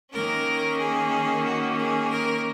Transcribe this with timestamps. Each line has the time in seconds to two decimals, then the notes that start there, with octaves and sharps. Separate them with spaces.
0.12 D#3 A#3 C#4 A#4
0.78 G#4
1.43 F#4
1.76 G#4
2.09 A#4